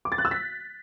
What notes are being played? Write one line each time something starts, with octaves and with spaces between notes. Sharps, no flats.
D6
A6
F#6
E6
B6